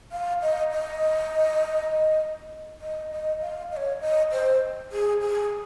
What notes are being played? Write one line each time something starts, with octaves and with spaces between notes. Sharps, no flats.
F5
D#5
D#5
D#5
D#5
F5
D#5
C#5
D#5
C5
G#4
G#4